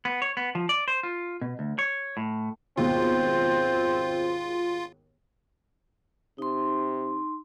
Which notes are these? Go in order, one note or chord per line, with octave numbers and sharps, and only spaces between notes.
B3
C#5
B3
F3
D5
C5
F4
B2
D2
C#5
A2
D#2 G#2 B2 C4 F4
C3 D#4 C6